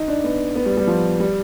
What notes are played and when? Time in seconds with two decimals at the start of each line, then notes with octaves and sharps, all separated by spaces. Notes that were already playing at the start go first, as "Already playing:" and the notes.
Already playing: D#4
0.08 D4
0.24 B3
0.55 B3
0.66 G3
0.77 G3
0.87 F3
1.20 G3